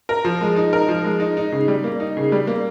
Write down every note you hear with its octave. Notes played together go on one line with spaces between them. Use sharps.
A#4
F3
G#3
D#4
A#4
F3
G#3
D#4
D#4
C#3
G3
A#3
D#4
C#3
G3
A#3